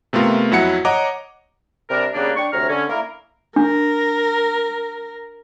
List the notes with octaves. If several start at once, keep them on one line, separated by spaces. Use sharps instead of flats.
C3 A3 B3 F4 A#4
F2 F#3 E4 F#5 C#7
C#5 D#5 F#5 A#5 D6
C3 G3 D4 A#4
C#3 G3 A#3 B3 D4
D4 G5 C#6
D2 C3 C#5 A#5 F6
D3 C#4
A#3 E4 A#4
D4 A#4